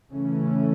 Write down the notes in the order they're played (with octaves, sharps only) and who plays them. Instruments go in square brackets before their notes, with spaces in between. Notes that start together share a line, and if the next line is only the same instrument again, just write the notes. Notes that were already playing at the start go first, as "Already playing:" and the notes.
[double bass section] C#3 E3 A3 C#4